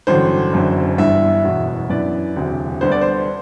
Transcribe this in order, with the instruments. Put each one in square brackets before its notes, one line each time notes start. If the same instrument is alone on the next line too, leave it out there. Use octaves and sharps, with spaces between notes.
[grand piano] A1 G2 D3 F#3 C5
F#1 F#2 D3 F#3
G1 G2 E3 G3 E5
F#1 E2 B2 F#3
F#2 E3 B3 D4 D5
E1 D2 C3 F#3
D2 D3 G3 B3 D4 C5
D5
C5